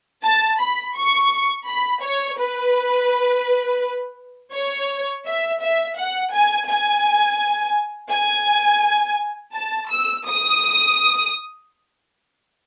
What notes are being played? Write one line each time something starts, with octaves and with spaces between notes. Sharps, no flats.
A5
B5
C#6
B5
C#5
B4
C#5
E5
E5
F#5
G#5
G#5
G#5
A5
E6
D#6